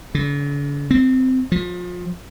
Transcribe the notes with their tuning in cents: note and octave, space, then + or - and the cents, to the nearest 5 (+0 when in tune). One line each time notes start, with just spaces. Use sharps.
D3 -45
C4 -15
F3 +30